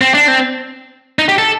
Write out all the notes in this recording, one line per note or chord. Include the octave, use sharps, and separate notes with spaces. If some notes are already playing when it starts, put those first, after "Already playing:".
C4
D4
C4
D#4
G4
A4